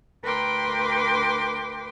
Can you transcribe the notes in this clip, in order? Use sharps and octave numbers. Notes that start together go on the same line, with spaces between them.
D2 A#4 B4 G5 C6 D6